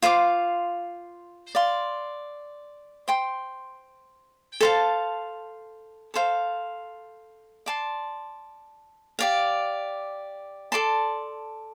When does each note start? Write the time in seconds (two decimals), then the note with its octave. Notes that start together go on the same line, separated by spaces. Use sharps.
0.02 F4 C5 F5 D6
1.55 D5 F5 C6
3.08 C5 G5 C6
4.60 A4 C5 F5 A5
6.14 A4 C5 F5
7.66 D5 A5 C6
9.19 G4 D5 F5
10.72 A4 D5 A5 C6